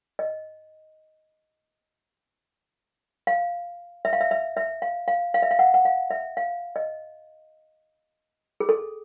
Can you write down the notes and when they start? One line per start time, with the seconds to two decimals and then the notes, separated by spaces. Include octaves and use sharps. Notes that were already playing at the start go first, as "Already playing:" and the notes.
0.19 D#5
3.27 F5
4.05 E5
4.13 F5
4.21 E5
4.31 E5
4.57 E5
4.82 F5
5.08 F5
5.34 F5
5.42 E5
5.51 F5
5.59 F#5
5.74 F#5
5.85 F5
6.11 E5
6.37 F5
6.76 D#5
8.60 G#4
8.69 A4